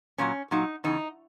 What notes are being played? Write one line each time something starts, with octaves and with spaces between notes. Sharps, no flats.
A#2 F#3 C#4
A#2 F#3 D#4
E2 C#3 D#4